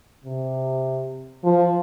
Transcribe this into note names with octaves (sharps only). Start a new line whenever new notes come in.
C3
F3